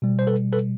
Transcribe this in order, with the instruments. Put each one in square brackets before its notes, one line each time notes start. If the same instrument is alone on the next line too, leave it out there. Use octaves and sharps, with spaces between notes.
[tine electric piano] B2 G3
C5
A4 B4
A4 B4